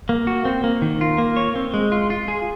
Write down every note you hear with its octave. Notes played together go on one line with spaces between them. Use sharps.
A#3
F#4
C4
A#3
D#3
F4
A#3
C#5
C4
G#3
F4
F4
G#4